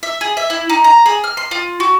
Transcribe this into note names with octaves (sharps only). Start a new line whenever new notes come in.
E5
G#4
E5
E4
D#4
A#5
G#4
F6
C6
F4
F#4